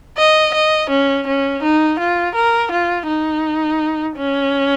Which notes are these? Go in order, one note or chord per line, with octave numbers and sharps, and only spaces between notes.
D#5
D#5
C#4
C#4
D#4
F4
A#4
F4
D#4
C#4